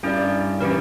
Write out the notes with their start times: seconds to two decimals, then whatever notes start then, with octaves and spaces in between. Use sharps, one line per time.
0.03 G2 C#4 E4 A#4 D5
0.60 E3 C#4 G4 A#4